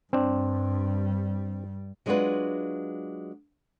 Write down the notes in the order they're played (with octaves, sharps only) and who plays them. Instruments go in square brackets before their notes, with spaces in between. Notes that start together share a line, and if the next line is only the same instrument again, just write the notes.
[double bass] G2 G3 [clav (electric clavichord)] C4 D4
[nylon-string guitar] F#3 G#3 D4 F4 F#4 B4